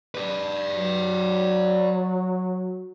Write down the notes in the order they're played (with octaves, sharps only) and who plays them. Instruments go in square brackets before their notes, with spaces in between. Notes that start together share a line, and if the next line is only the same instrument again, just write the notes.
[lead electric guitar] B4 D5
[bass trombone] F#3